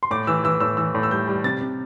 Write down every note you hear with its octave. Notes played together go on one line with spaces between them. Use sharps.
C6
A2 D6
E3 E6
E3 E6
A2 E6
E3 E6
A2
E6
G3 G6
G3
C3 A6
C3